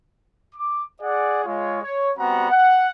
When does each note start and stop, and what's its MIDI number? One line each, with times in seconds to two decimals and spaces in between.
0.55 0.83 86
1.01 1.41 68
1.01 1.41 74
1.01 1.41 78
1.44 1.80 56
1.44 1.80 65
1.44 1.80 73
1.82 2.11 73
2.18 2.47 55
2.18 2.47 59
2.18 2.47 60
2.18 2.47 66
2.18 2.47 78
2.18 2.47 82
2.51 2.89 78